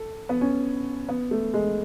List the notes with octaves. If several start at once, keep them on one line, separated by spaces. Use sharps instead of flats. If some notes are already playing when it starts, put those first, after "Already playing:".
Already playing: A4
B3
C#4
B3
A3
G#3